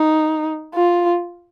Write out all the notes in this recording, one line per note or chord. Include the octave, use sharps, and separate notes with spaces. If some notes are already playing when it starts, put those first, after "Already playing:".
Already playing: D#4
F4